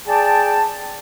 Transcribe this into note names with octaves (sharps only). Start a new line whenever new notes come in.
G#4 D5 G5 A5